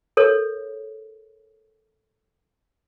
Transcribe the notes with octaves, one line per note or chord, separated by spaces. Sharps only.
A4 A#4 C#5